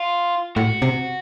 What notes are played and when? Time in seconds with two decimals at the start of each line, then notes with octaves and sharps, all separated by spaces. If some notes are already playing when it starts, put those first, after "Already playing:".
Already playing: F4
0.56 A2 F#4
0.82 C3